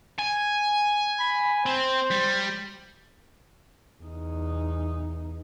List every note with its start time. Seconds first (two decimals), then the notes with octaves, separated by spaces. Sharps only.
0.19 G#5
1.19 B5
1.66 C4 C5
2.11 G3
4.02 E2 D#4